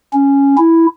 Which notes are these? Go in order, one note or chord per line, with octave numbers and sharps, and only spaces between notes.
C#4
E4